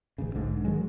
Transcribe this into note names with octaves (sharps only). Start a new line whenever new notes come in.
D1 A1 D2 C#3
B1 G#2 D3
D#3 F#3 G#3